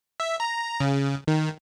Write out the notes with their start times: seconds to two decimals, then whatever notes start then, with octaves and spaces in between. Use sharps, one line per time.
0.20 E5
0.40 A#5
0.80 C#3
1.28 D#3